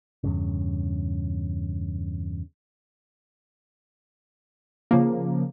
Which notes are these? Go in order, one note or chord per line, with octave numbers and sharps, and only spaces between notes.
E2 G2 C#3
C#3 F3 A#3